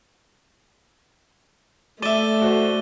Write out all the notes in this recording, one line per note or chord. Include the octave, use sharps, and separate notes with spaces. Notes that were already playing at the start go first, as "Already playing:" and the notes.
A3 D5 E5 D6 D#7 G7
F#4 A4 C5